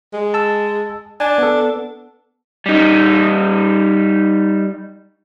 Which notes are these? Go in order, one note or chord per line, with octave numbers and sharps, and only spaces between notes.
G#3
A5 E6
D4 G#5
B3 A4
G3 D#4